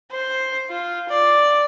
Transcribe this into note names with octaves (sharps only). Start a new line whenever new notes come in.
C5
F4
D5